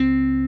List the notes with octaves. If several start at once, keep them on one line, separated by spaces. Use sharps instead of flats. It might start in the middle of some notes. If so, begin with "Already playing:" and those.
Already playing: C#2 C4